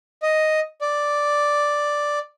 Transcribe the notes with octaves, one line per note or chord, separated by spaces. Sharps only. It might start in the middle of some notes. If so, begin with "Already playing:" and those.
D#5
D5